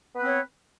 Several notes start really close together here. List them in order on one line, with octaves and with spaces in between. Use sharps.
B3 B4 C4 C#5